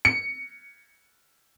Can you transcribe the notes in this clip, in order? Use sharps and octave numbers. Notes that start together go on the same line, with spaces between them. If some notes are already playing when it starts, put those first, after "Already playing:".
C#7